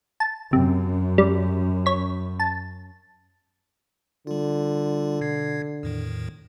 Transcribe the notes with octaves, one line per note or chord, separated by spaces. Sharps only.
A5
F#2 C3
G3
C#5 B6
A5
D3 G3 F4
B2 G#6 C7
E2 A2 D#3